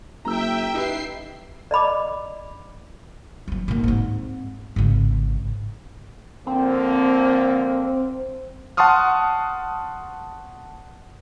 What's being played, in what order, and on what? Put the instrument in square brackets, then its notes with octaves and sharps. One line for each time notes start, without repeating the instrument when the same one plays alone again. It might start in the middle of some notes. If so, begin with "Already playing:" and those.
[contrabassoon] F#1 [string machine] E5 G5 [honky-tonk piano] A#5 E6
[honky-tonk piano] D#4 G4 B4 [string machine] C7
[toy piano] D5 D#5 B5 D6
[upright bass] E3 F#3
B1 A#3
G#2 C4
G#1 C#3
[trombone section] D3 F3 A#3 [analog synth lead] C4
[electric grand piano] F#5 A5 C6 C#6 D#6 F6